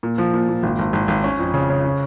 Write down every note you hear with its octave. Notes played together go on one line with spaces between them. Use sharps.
A#2
F3
A#2
A#2
G#1
G#1
G#1
G#1
C#4
F2
C#3
C#3
C#4